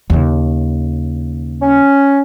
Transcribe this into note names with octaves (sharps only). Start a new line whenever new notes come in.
D#2 C#3
C#4